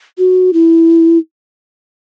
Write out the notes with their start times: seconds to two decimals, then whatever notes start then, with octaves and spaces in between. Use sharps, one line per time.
0.18 F#4
0.53 E4